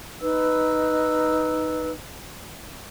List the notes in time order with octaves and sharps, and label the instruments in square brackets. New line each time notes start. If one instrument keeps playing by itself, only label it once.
[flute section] D#4 B4 E6